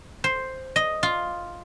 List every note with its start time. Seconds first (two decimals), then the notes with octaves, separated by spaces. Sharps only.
0.24 C5
0.76 D#5
1.03 F4